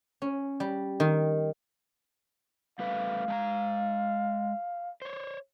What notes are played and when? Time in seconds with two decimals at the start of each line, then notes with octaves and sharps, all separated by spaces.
0.22 C#4
0.60 G3
1.00 D#3
2.79 G3 A3 B4 F5
3.28 G#3 A5 A#5
5.02 C5 C#5